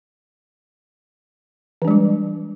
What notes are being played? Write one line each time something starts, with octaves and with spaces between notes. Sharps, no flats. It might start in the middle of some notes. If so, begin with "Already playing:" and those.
E3 G3 G#3 D4